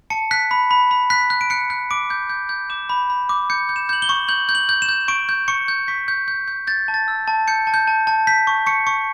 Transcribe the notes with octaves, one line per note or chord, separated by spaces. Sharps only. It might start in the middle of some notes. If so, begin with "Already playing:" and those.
A5 C#7
F#6 B6
B5
B5
B5
F#6 B6
F#6
D7
F#6 C#7
F#6
D6 D7
G6
G6
G6
D6 E7
B5
B5
D6
G6 C#7
G6
E7
G6 F#7
G7
C#6
G6 F#7
G6
F#7
G6
E7
G6
C#6 D7
G6
C#6 C#7
G6
C#6 B6
G6
G6
G6
G6 A6
A5
A6
E6
A5
G6 C#7
A5
G6
A5
A5
G6 B6
C#6
C#6 C#7
C#6